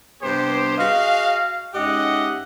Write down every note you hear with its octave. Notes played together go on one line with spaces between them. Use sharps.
G2 C3 B3 G4 C5
F#4 G#4 D#5 F5
G#2 C#4 G4 D#5 E5 F#5